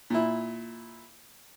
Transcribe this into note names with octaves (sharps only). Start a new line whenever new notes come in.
A#2 E4